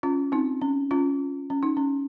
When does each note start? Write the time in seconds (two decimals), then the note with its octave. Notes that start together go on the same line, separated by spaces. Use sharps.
0.03 C#4 F4
0.32 C4 D#4
0.62 C#4
0.91 C#4 F4
1.50 C#4
1.63 D#4
1.77 C#4